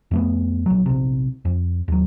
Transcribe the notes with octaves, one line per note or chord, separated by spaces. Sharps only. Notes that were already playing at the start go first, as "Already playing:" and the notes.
F2 A3 B3
A#1 F#3
A#1 C3
F2
D#2 F#3